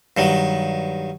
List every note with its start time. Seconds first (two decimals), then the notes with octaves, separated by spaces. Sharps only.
0.17 G2 D#3 F#3